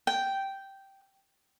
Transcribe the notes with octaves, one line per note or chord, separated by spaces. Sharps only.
G5